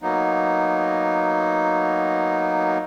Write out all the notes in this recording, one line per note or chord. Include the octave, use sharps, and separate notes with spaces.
F#3 A#3 B3 D#4